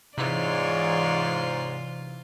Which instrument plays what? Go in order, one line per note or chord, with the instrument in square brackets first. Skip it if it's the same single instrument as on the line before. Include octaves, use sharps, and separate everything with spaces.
[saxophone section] G#2 [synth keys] C3 E3 [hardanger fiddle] F4 [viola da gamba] C#5 D5